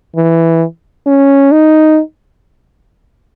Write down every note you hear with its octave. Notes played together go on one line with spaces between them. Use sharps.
E3
C#4
D#4